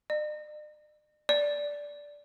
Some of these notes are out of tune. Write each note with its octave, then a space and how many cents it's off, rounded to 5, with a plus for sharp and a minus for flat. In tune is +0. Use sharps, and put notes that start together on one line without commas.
D5 +45
D5 -10